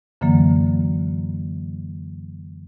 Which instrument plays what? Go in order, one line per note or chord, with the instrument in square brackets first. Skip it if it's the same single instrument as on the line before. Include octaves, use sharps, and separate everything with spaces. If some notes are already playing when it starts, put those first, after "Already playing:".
[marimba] F#2 D3 E3 F#3 A#3